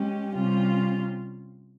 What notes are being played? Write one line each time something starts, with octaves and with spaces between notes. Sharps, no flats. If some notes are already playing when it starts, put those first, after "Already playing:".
Already playing: G#3 C#4 G4
C3 G3 C#4 F4